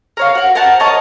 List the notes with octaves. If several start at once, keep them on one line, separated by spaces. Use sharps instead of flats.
A#4 C#5 F5
F#4 A#4
A#4 C5 F#5 A5
A#4 C#5 D#5 A5